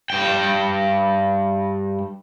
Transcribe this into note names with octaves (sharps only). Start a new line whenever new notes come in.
G2 G5